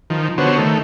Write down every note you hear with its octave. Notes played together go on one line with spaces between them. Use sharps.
D#3 F3
D3 B3 F#4 C5 C#5
D#3 A3